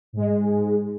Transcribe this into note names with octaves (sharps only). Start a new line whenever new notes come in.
G#2 G#3